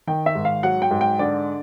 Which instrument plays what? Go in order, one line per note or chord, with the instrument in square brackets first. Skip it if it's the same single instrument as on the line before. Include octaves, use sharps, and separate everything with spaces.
[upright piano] D#3 G5
E5
G#2
F5
F#3 F#5
G5
G#2
G5
D3 D5